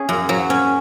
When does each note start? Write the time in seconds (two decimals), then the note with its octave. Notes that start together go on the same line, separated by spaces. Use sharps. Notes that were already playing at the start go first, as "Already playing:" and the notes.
Already playing: C#4 G#4
0.09 F#2
0.29 F#3
0.50 C#4